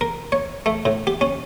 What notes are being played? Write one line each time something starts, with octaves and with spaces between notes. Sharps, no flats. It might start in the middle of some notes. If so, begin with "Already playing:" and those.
A#4
C#5
A3
A2
G4
C#4